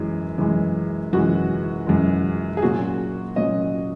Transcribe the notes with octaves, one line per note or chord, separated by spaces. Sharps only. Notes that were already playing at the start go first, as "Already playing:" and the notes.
Already playing: F#2 E3 G#3
F#2 E3 G#3
F#2 E3 G#3 F#4
F#2 E3 G#3
G#4
A#2 F#3 C#4 F#4
A#2 F#3 C#4 D#5